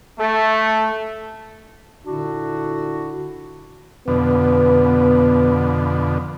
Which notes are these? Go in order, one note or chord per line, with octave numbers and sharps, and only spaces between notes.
A3
A#2 D3 D4 E4 F#4
F2 B2 D3 B3 B4